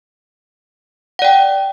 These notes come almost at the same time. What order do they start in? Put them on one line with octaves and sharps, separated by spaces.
F#5 D5 G5